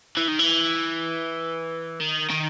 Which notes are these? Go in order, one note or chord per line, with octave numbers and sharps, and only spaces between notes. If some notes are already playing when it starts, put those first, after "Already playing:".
E3
D#3
E3
D#3
D#3